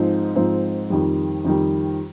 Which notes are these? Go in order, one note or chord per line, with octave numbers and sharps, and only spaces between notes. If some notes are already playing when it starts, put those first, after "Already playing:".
Already playing: G#2 F3 C4 D#4
G#2 F3 C4 D#4
F2 D#3 G3
F2 D#3 G3